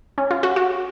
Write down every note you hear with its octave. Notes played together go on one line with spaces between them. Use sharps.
C#4
F4
F#4
F#4